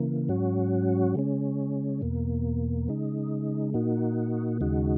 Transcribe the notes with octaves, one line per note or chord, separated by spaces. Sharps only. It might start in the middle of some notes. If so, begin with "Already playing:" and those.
Already playing: C#3 E3 A#3
G#2 F#3 C#4 F#4
C#3 G#3 C#4
E2 B2 A#3
C#3 G#3 D#4
A#2 A#3 D#4 F#4
D#2 C#3 G#3 D#4 F#4